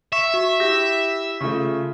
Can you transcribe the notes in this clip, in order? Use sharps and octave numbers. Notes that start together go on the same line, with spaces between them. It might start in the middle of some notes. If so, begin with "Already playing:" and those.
E5 C#6
F#4
E4 G4 E6 G6 A#6
C#3 A3 F4 C#6